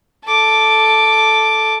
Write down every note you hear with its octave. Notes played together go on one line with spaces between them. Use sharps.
A4 D6